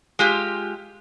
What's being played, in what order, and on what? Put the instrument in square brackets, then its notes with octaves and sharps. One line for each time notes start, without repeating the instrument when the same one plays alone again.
[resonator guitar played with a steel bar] G#3 F4 G4